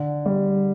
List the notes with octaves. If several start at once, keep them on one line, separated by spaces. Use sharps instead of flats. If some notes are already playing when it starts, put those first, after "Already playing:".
Already playing: D3
G3